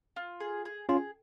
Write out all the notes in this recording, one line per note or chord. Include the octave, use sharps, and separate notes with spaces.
F4
G#4
G#4
C#4 F4 G#4